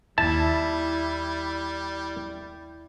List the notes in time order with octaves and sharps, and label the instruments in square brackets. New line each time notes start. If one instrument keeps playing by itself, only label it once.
[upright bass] D#2 F4 [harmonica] G3 [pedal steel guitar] E4 [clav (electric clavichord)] A5